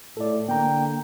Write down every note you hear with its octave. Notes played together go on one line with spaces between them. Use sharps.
A2 A4 D5
D3 A#3 G5 A#5